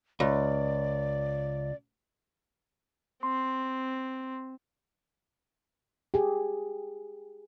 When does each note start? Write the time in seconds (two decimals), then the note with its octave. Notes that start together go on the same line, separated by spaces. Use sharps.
0.20 C#2 D5
3.23 C4 C6
6.14 G4 G#4